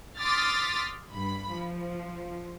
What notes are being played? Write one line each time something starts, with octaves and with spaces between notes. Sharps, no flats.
C6 D6 D#6 F6 A6 B6
G2 B5
F3